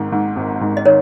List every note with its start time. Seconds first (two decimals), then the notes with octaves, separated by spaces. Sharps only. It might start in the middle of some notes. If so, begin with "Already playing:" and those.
Already playing: G#1 G#2 D#3
0.12 G#2
0.36 G#1
0.61 G#2
0.77 D#5
0.85 D#3 A#4 C#5